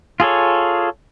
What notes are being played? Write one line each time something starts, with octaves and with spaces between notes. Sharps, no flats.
F4 G#4 A4 C#5